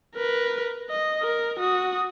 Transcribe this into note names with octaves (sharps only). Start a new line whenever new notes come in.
A#4 B4
D#5
A#4
F#4 D#6